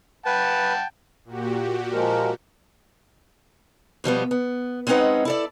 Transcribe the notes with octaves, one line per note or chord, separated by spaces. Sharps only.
B4 F#5 G5 A5
A#2 F#4 G4
F3 G#3 A#4
B2 F3 G3 B3
B3
G#3 C4 C#4 D#4 B4 F#5
E4 A4 D5